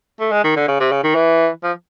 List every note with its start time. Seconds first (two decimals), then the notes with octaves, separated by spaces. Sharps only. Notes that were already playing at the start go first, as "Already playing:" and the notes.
0.20 A3
0.31 G#3
0.44 D#3
0.56 D3
0.68 C#3
0.80 C3
0.92 C#3
1.04 D#3
1.15 E3
1.63 F3